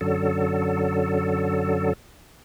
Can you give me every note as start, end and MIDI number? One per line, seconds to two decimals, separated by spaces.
0.01 1.93 42
0.01 1.93 50
0.01 1.93 54
0.01 1.93 69